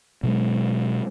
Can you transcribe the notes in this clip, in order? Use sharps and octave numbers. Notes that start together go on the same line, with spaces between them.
B2 F#3 G#3